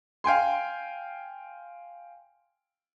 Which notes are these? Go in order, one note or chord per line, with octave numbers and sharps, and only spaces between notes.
F5 G5 G#5 C6